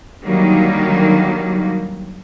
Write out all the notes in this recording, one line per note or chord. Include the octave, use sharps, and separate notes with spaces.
D3 D#3 F#3 G3 A#3